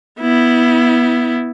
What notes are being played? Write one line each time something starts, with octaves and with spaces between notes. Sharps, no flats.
B3 E4